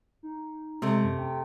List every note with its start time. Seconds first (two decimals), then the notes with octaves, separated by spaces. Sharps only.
0.23 D#4
0.82 C3 G#3 A3
1.03 F#2
1.19 G5